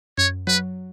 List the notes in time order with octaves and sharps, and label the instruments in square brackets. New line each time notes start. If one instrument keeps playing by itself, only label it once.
[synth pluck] F#2 [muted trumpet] C#5
[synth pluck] F#3 [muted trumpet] B4